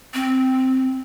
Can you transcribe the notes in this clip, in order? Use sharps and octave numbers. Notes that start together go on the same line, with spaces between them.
C4